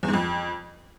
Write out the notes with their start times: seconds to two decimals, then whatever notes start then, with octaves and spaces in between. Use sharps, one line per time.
0.03 E2
0.08 G#2
0.14 F2